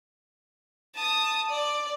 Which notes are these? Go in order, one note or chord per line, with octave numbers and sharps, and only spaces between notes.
A5 D#6
D5